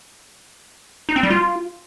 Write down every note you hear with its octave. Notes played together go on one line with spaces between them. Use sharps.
D#4
C4
G3
F4